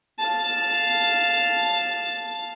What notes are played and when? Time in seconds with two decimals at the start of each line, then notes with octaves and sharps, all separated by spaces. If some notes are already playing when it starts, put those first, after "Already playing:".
0.19 F5 A5